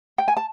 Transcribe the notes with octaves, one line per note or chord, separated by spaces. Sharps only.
G5
G#5
A5